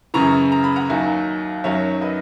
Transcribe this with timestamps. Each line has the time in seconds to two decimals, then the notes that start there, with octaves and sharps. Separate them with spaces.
0.14 F#2 C#3 E3 A#5 C#6
0.52 A#5
0.64 B5
0.76 F#5 A#5
0.89 D#2 D#3 F#3 E5 G#5
1.64 F#2 D#3 F#3 C#5 E5
2.01 B4 D#5